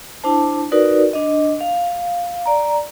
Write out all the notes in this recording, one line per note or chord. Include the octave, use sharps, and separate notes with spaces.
D4 E4 C5 A5
D#4 F#4 A#4 B4 D5
D4 D#5
F5
D5 A#5